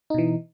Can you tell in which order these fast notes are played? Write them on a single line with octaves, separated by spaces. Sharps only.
D#4 B2 E3